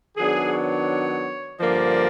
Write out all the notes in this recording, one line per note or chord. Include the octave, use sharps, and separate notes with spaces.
D#3 F#3 B3 D4 G#4
C#5
G2 D3 F3 A#3 D5